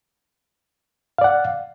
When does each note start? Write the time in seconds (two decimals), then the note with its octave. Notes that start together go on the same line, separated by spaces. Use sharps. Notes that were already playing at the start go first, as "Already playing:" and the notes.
1.18 F5
1.21 D5
1.24 F#5